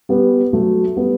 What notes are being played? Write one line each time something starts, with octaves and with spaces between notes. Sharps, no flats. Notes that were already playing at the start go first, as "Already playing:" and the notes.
G3 B3
F#3 A3
G3 B3